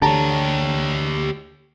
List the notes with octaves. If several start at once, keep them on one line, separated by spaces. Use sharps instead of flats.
D2 D3 G4 C#5 A5 A#5